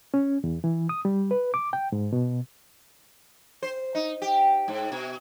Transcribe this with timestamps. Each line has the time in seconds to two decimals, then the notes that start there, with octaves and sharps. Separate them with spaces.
0.14 C#4
0.44 E2
0.64 E3
0.89 D#6
1.05 G3
1.31 B4
1.54 D6
1.73 G5
1.92 G#2
2.13 B2
3.63 C5
3.95 D#4
4.22 G4
4.68 G#2
4.92 B2